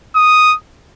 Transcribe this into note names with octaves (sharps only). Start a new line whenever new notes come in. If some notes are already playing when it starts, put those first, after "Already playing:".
D#6